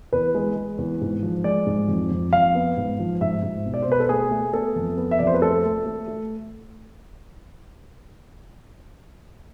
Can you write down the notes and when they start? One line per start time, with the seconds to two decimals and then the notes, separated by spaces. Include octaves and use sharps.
0.13 E2 B4
0.35 G#3
0.56 G#3
0.78 E2
1.01 G#2
1.23 F3
1.44 G#3 D5
1.66 G#2
1.88 F2
2.11 F2
2.33 F2 F5
2.55 B3
2.77 G#2
2.99 F3
3.21 G#2 E5
3.43 G#2
3.65 B2
3.74 D5
3.82 C5
3.87 B2 B4
4.00 A4
4.09 A3 G#4
4.31 A3
4.54 B3 A4
4.76 F2
4.98 B3
5.11 E5
5.19 F2 D5
5.27 C5
5.34 B4
5.42 A3 A4
5.64 A3
5.86 A3
6.08 A3